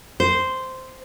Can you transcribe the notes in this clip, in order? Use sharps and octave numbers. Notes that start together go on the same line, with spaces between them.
C5